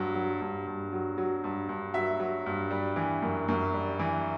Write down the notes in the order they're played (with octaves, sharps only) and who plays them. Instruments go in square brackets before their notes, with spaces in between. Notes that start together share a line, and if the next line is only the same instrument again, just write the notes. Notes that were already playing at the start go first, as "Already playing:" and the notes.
Already playing: [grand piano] G2 F#3
F#3
G2
G2
F#3
F#3
G2
G2
F#3 E5
F#3
G2
G3
E3
F#2
F#2
G3
E3